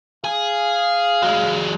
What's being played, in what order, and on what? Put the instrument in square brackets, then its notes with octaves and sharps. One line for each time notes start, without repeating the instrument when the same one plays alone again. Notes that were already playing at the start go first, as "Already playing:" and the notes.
[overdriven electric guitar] G#4 [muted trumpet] F5
[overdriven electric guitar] F#3 G#3